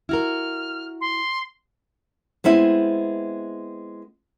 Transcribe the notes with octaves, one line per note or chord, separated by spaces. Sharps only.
E4 F#4 A#4 F6
C6
G#3 B3 C4 E4